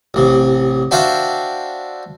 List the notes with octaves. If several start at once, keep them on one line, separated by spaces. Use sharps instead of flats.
A1 C3
D4 F#4 C5 E5 F5 G5